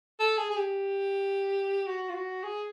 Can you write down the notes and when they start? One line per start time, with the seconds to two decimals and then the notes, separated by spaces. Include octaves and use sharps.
0.20 A4
0.38 G#4
0.50 G#4
0.57 G4
1.87 F#4
2.09 F4
2.15 F#4
2.44 G#4